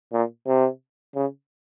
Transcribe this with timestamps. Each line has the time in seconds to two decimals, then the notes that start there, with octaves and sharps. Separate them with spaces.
0.13 A#2
0.47 C3
1.15 C#3